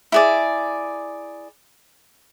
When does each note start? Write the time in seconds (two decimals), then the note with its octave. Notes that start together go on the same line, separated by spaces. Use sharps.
0.12 E4 G#4 D5